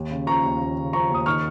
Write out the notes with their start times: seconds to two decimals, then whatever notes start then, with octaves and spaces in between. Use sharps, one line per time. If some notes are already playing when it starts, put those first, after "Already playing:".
Already playing: D#2
0.11 C#3
0.27 F3 A#5 C#6
0.44 D#2
0.60 D#2
0.77 C#3
0.93 F3 A#5 C#6
1.10 D#2 D#6
1.26 D#3 C#6 F6